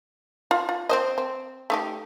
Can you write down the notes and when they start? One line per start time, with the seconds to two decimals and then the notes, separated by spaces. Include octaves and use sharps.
0.51 F4
0.69 F4
0.89 C4 C5 D#5
1.18 C4
1.70 A3 D#4 G4